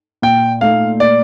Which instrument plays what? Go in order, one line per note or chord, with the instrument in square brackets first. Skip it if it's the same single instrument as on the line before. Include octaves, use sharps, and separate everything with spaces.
[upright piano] A#2 [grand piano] G5
[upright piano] A3 D#4 [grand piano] F5
[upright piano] A#2 [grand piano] D5